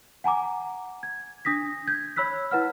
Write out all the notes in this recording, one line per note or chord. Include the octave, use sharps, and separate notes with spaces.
F#5 G#5 A#5 D6
G#6
D4 D#6 A#6 B6
G6 G#6
C#5 B5 E6 F#6 B6
E4 B4 F#5 F6